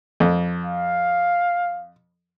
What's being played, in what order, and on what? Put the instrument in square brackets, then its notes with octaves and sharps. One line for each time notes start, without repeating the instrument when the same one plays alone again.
[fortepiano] F2
[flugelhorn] F5